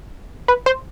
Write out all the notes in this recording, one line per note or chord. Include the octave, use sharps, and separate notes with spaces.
B4
C5